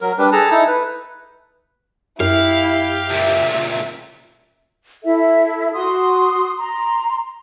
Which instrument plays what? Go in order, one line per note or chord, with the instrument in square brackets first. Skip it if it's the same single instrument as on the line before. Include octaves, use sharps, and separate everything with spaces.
[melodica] F#3 A#4
G3 D4 B4
G#4 A4 A5 A#5
D#4 E4 A4
B4
[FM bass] F#2 [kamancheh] E4 [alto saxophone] G4 [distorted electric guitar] F5
[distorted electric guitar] C#2 A#2 [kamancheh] E5
[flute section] E4 A4 E5
F#4 C6 D#6
A#5 C6